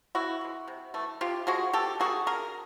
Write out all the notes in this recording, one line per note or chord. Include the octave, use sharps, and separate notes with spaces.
C#3 E4 F#4
E3 G#3
C3
E3 A3
C3 F4 G4
F3 G#3 F#4 G#4
B2 G4 A4
G3 A#3 F#4 G#4
D3 G#4 A#4